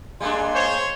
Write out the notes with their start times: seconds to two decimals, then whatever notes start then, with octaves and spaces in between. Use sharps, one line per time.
0.21 G3 G#3 A#3 D4 G#5 C6
0.54 C5 C#5